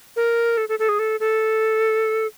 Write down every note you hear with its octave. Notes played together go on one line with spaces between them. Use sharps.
A#4
A4
A4
A4
G#4
A4
A4